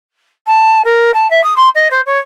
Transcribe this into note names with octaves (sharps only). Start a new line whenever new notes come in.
A5
A#4
A5
E5
D#6
C6
D#5
C5
C#5